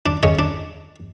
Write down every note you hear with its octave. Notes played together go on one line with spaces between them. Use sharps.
D4
C#3 C#5 D#5
D4